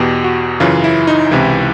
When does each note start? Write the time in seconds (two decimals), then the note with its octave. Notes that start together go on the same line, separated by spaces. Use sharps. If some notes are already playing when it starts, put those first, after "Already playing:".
Already playing: E2 B2 G4
0.24 F#4
0.60 F#2 C#3 E3 F4
0.84 E4
1.07 D#4
1.31 C#2 C3 E3 E4